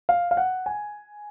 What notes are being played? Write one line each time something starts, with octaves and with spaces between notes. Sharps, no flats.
F5
F5
F#5
G#5